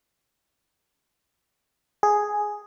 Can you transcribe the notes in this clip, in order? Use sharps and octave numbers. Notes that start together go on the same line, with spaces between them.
G#4